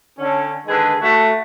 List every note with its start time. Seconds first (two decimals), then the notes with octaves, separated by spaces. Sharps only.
0.19 D3 C#4
0.67 D3 D#3 G#3 G#4 B4
1.01 A3 F#4